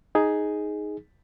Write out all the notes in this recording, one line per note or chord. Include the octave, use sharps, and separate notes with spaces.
D#4 G#4